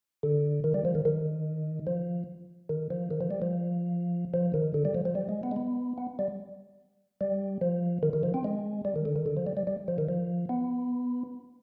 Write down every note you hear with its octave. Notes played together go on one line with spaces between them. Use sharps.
D3
D#3
G3
F3
D#3
D#3
F3
D#3
F3
D#3
F3
G3
F3
F3
D#3
D3
G3
F3
F3
G3
G#3
B3
G#3
B3
B3
G3
G3
F3
D#3
D#3
F3
C4
G#3
G3
D#3
D3
D#3
D3
F3
G3
G3
G3
F3
D#3
F3
B3